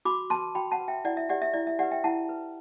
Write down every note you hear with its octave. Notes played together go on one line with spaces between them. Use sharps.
F#4 B5 D6
B4 A5 C6
F#4 G5 B5
F#5 A5
B4
E5 G5
E4 D5 F#5
E5
G4 B4 D5 F#5
E5
E4 D5
E5
G4 B4 D5 F#5
E5 G5
E4 F#5 A5
B4